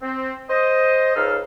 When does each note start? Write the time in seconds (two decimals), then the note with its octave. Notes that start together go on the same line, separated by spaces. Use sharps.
0.02 C4
0.49 C5 D#5
1.16 C#2 G#2 D#4 A4 F5 F6